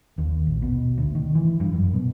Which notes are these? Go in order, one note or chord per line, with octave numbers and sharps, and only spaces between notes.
D#2
A#1
B2
D2
D#3
E3
G2
F#2
B2